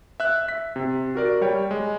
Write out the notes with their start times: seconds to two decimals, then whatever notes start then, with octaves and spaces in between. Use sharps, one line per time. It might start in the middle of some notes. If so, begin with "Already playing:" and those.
0.20 E5 F#6
0.46 E5 B6
0.76 C3
1.15 F#4 A#4 D5
1.41 G3 C#5 G5
1.71 G#3